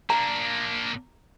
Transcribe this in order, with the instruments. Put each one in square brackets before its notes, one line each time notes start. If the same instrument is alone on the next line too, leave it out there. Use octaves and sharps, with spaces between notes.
[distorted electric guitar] A#3 D4 [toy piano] A#5